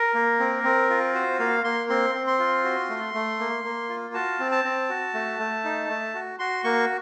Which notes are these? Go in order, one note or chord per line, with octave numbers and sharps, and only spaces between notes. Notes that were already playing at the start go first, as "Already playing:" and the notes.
Already playing: A#4
A#3
C4
C4
F4
F#4 C5
A#3 F5
A#3 C6
C4 C6
C4
C6
F4
F#4
A3
A3
A#3
A#3
F4
F#4 A5
C4
A5
C4
F#4
A3
A3
D#4
A3
F#4
F#4 C6
A#3 C#6